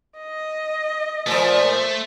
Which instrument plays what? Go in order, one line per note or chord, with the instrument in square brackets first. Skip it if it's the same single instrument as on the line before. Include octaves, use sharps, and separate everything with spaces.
[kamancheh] D#5
[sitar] A#2 F3 [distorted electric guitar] A3 [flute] C5